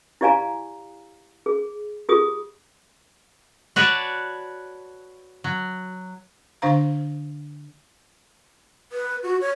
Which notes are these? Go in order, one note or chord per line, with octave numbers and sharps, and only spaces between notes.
E4 G4 D5 F5 G#5 A#5
G#4
F4 G4 G#4 D#6
F#4 B4 C#5 D5 A5
F#3
D3 D4 C5 F5 A#5
B4
F#4
C#5